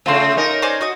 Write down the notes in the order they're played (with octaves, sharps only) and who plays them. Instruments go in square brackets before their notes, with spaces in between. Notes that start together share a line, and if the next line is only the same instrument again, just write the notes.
[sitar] C#3 A3 C4 [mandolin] F4 C6
[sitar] C#4 D#4 A#4
[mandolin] C5 D5 G#5
F#4 D#5